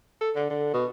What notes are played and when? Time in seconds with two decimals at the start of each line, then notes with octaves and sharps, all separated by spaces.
0.21 A4
0.35 D3
0.50 D3
0.73 B2